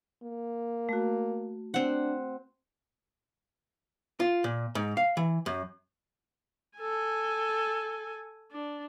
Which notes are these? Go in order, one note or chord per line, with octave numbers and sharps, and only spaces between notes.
A#3
A3 F#4
C4 D4 F#5
F4
A#2
G#2
F5
E3
F#2
A4 G#5
D4